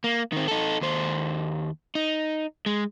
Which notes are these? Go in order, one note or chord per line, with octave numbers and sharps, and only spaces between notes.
A#3
D#3 C4
D#4 A4
D#2 C5
D#4
G#3